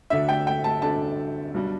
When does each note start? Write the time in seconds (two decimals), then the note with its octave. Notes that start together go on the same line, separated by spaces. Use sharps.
0.10 D2 D3 A3 D4 E5
0.29 G5
0.47 G5
0.64 A5
0.82 D2 D3 A3 D4 A5
1.54 B1 B2 G3 D4